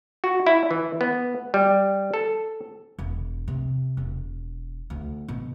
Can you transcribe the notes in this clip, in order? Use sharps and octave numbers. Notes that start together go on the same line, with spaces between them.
F#4
E4
E3
B3
G3
A4
E1
C3
E1
D2
B2